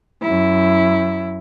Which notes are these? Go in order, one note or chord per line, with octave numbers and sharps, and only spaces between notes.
F#2 E4